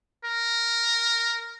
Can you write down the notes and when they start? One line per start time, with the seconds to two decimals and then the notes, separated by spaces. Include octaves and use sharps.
0.25 A#4